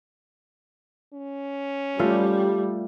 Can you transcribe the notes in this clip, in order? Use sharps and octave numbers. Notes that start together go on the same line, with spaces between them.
C#4
G3 A3 F4